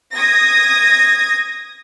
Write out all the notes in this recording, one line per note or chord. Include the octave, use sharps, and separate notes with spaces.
D#6 G#6 A#6